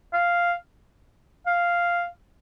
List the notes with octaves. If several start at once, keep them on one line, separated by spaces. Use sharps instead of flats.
F5
F5